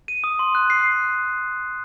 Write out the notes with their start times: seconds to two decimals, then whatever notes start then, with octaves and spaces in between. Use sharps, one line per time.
0.08 D#7
0.24 D#6
0.39 C6
0.55 F#6
0.70 C7